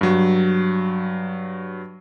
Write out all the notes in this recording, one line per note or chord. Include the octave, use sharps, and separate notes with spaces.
G2 F#3